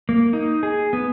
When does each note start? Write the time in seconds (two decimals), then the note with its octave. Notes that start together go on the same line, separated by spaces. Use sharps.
0.09 A#3
0.33 D#4
0.63 G#4
0.93 B3